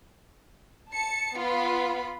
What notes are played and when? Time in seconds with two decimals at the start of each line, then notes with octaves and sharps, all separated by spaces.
0.92 A5 C#7
1.36 B3 F4 B5